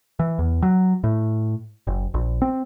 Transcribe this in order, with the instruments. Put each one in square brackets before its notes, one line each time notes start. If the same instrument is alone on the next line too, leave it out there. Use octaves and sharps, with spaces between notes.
[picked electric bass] E3
E2
F#3
A2
F#1
A#1
C4